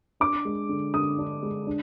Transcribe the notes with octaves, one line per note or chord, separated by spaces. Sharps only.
D4 D6
G#3
D3
D3 D#6
D4
G#3
D4